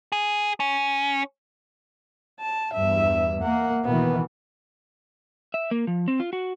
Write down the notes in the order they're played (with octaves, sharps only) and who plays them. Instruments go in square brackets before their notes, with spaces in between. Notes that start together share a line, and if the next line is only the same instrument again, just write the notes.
[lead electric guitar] G#4
C#4
[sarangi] A5
[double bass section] E2 G2 [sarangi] E5
[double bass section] A#3 [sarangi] F#5
[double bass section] B2 D#3 E3 [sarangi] B3
[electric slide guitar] E5
A#3
F3
C4
F4
F#4